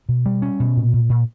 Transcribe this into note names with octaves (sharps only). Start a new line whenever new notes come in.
B2
G3
C#4
B2
A#2
A#2
A#2